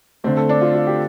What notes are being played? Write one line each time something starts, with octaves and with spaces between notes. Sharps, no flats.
D3 A3 C4
A4
D4
F4
F4
G4